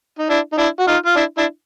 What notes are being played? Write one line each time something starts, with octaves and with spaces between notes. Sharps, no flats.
D#4
D4 E4
D#4
D4 E4
F#4
D#4 F4
F4
D4 E4
D4 E4